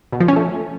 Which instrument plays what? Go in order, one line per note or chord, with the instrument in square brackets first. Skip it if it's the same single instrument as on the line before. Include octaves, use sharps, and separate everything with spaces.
[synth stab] B2
F3
C#4
A3